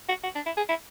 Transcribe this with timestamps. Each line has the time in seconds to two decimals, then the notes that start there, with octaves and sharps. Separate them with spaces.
0.09 F#4
0.24 F#4
0.35 D4
0.46 E4
0.57 G#4
0.69 E4